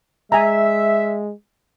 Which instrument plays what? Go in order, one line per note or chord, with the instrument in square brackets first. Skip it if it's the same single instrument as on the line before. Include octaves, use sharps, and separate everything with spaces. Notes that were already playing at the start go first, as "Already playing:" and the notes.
[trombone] G#3 [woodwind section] E5 [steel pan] G#5 A#5